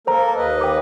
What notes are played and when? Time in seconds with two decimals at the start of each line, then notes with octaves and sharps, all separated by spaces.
0.07 A#3 A4 A#4 C5 A#5
0.35 D#2 B4 D#5
0.61 G5 D6